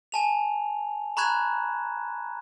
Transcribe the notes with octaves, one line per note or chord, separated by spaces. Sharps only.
G#5 A5 F7
A#5 B5 C#6 F#6 G#6 E7